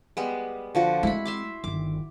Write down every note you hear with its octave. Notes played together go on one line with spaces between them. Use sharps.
G3 G#3 B3
D3 F3 F#4
G#3 C4 E4 B5
E5 C6 D6
G1 D#3 D6